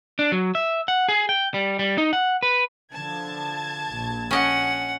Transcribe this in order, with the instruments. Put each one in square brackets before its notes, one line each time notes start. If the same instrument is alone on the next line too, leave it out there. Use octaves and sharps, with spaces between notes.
[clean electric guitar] D4
F#3
E5
F#5
G#4
G5
G3
G3
D#4
F#5
B4
[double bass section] D3 F3 [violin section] A5 G#6
[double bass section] A#1
[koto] C#4 D#5 [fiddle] F#5